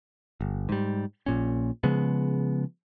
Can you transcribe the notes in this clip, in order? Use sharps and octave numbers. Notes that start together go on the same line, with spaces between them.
G1
G#2 G3
A#1 A#2 C#4
C#3 F3 G#3 B3